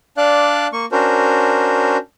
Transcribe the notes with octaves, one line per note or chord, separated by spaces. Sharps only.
D4 D5 F5 F#6
A#3 C#6
C#4 D4 F#4 A#4 C5